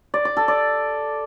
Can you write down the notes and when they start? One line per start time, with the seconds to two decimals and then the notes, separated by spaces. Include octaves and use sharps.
0.14 D5
0.25 D5
0.37 A4
0.48 D5